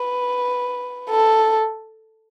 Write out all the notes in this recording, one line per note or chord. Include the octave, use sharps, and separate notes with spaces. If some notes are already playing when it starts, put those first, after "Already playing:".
Already playing: B4
A4